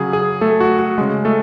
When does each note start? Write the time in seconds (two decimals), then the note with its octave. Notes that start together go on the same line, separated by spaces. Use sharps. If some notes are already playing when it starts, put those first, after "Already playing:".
Already playing: C#3 F#3 G#4
0.13 G#4
0.41 A3 A4
0.60 F#4
0.79 F#4
0.98 C#3 G#3
1.25 A3 A4